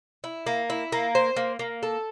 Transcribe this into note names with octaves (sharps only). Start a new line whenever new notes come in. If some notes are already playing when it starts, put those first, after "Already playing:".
E4
A#3
E4
A#3
C5
A#3
A#3
A4